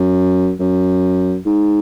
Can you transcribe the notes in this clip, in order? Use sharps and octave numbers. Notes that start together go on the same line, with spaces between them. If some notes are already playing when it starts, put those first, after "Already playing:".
Already playing: F#2
F#2
G#2